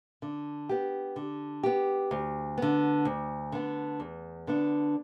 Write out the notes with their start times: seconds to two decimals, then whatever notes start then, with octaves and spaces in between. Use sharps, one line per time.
0.22 D3
0.69 B3 G4
1.16 D3
1.63 B3 G4
2.11 D2
2.58 D3 B3
3.05 D2
3.52 D3 B3
4.00 E2
4.47 D3 B3 D4